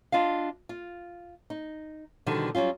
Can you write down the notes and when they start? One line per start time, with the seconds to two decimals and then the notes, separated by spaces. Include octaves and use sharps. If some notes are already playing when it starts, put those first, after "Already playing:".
0.12 D4 F4 D#5 F5
0.69 F4
1.50 D#4
2.26 B2 D3 D#3 F3 G3 F#4
2.55 F#3 G3 C#4 F4